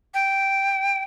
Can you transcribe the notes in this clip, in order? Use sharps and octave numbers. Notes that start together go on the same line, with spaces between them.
G5